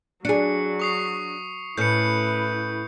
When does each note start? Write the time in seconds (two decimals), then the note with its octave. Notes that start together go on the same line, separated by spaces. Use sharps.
0.25 F#3 D4 G#4 C#7
0.80 C#6 D#6 C7
1.78 A2 C#4 E4 B4 G6 C#7